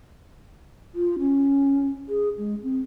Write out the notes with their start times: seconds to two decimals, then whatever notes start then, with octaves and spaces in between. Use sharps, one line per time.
0.95 F4
1.19 C#4
2.09 G#4
2.38 G#3
2.63 C4